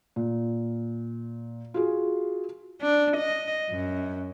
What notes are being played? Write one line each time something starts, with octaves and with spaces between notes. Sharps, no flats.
A#2
F4 F#4 G#4
D4
D#5
F#2